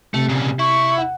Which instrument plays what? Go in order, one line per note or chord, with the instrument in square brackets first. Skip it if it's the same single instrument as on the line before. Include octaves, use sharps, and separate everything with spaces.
[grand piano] C3 [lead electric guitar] A3
[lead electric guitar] A#2 C#3
[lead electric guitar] E4 [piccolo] C#6
[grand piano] F#5